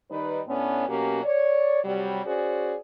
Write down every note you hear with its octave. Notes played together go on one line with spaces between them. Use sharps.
D#3 G3 D#4 B4
A2 A3 B3 C#4 D4
B2 F#3 A#3 C#4 G4
C#5 D5
C3 F#3 G3
C#4 F#4 G#4 C5 D5